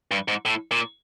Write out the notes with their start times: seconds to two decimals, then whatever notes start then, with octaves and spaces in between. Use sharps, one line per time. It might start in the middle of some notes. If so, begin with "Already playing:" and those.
0.11 G2
0.28 G#2
0.45 A2
0.71 A#2